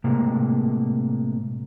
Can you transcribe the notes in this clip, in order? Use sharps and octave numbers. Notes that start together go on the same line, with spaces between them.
A2 C3 G#3 A#3